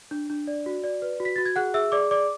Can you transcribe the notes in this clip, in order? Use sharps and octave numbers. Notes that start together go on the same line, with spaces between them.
D4
D4
D5
F#4
D5
B4
F#4
B6
F#4 A6
G#6
G#4 F#5 F#6
G#4 E5 E6
G#4 D5 D6
D5 D6